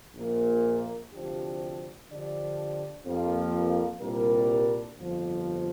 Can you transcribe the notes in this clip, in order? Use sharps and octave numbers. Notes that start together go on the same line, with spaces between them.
A#1 A#2 A#3
D2 C3 F3 D4 G4
D3 F3 D4 G4 D5
F2 F3 A#3 G4
C2 A#2 G3 D4 A#4
G1 F2 F3